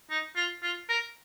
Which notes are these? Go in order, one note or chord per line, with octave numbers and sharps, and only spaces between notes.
D#4
F4
F4
A#4